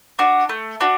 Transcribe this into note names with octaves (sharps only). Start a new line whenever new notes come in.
D4 F#4
A3
D4 F#4